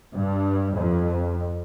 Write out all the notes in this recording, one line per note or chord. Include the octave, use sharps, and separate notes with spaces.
G2
F2